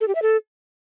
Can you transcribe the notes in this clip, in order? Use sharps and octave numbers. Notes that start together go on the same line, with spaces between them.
A4
G4
E5
A4